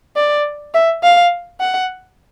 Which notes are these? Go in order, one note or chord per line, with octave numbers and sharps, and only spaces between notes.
D5
E5
F5
F#5